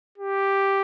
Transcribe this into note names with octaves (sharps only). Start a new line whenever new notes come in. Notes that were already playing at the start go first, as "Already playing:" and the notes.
G4